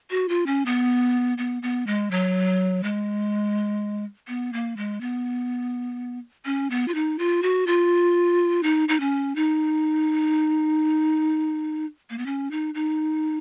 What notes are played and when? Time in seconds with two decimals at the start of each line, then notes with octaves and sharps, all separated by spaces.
0.10 F#4
0.29 F4
0.46 C#4
0.66 B3
1.38 B3
1.63 B3
1.87 G#3
2.11 F#3
2.83 G#3
4.28 B3
4.53 A#3
4.77 G#3
5.01 B3
6.45 C#4
6.70 B3
6.88 F4
6.94 D#4
7.19 F4
7.43 F#4
7.67 F4
8.63 D#4
8.89 D#4
9.00 C#4
9.36 D#4
12.10 A#3
12.18 B3
12.26 C#4
12.51 D#4
12.74 D#4